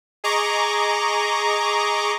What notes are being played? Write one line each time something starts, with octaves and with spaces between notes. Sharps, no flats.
G#4 D#5 A#5 C#6 D6